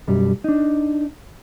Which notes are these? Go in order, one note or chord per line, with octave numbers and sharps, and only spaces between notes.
B1 F#2 G3
D4 D#4